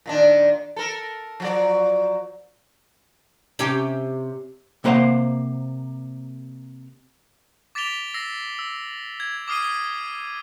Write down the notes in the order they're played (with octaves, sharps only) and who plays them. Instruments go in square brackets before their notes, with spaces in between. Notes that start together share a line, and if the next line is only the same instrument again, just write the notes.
[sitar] A#2 D#3 D4
A4 A#4
F3 F#3 D5
[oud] C3 C#4 G4
[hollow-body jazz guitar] C3 A#3 B4 C5 F5 F#5
[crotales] D6 A6 B6 D7 F7 G7
E6 A#6 C7
E6
G#6
D6 D#6 F6 C7 D#7